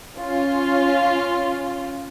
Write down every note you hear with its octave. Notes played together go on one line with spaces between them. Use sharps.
C#4 F4